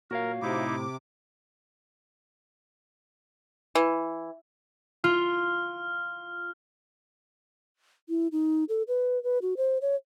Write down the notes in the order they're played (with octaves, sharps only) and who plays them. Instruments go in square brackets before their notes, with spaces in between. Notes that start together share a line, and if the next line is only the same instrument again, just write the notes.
[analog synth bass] A#2 [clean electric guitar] F#4 C#5 F5 [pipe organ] A#4
[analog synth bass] A2 [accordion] C3 D6 [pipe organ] D#4 E4
[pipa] E3
[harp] F4 [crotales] F6
[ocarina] E4
D#4
A4
B4
B4
F#4
C5
C#5